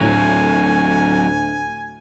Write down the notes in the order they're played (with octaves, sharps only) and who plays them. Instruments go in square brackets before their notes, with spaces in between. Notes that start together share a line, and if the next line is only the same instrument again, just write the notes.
[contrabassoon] D2 [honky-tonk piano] A2 [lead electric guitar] F#3 C4 [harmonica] G#5